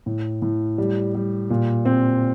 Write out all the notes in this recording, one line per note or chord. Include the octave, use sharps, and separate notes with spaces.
A2
A2
G3
G3
A#2
C4